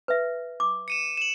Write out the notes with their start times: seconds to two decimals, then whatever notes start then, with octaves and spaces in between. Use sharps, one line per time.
0.08 B4 E5
0.60 D6
0.88 C#7 D#7 E7
1.17 E7 F#7